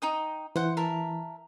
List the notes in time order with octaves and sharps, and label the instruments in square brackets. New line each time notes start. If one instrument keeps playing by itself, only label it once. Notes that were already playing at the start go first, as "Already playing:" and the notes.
[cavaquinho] D#4 G5 D#6
[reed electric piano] E3 [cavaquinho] C5 F#5
[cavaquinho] A#4 E5 A5